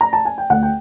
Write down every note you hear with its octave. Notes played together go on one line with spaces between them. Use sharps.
A#5
A5
G#5
G5
D2 F#5
G5